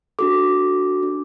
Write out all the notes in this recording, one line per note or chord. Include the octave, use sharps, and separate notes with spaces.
D4 F#4 A4 D6
D4 G4